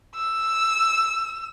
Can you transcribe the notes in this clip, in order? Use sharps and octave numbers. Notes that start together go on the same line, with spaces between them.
E6